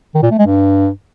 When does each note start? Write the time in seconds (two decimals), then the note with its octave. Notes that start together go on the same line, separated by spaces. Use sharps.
0.15 D#3
0.23 A#2
0.31 A3
0.39 G#3
0.47 G2